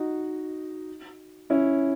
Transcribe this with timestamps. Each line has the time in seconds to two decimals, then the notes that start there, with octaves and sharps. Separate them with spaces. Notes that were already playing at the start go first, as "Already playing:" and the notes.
Already playing: D#4 F#4
1.50 C#4 E4